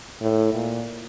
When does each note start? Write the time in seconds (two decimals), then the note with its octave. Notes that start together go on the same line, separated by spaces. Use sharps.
0.21 A2
0.53 A#2